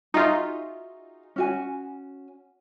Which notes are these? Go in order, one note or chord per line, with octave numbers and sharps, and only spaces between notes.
D#4 F4 F#4 G#4 E5
C#4 F#4 G#5